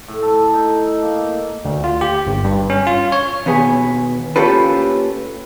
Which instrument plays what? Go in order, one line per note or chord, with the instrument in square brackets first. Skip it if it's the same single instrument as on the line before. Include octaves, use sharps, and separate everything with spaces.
[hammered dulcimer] A2
A4
D#4
A#3
[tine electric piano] D2
F4
G4
G1
G2
C#4
F4
C#5
[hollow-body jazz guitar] D#2 B2 B3 G#4
A#3 C#4 F4 G4 A4 B4